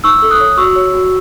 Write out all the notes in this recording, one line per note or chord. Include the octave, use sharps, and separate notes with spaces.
D#4 C#6 E6
A4
D#6 F#6
C#5
F#4 C#6 E6
C#5
F#4